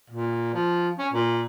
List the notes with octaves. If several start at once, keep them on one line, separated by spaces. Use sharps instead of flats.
A#2
F3
C#4
A#2